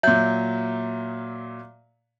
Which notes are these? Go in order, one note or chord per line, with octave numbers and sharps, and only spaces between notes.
A#2 F#3 E5 G6